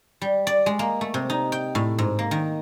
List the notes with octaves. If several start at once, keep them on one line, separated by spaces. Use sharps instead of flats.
G3
D5
G#3
A#3
A3
C3
D#4
G5
A2
G#2
A#3
D#3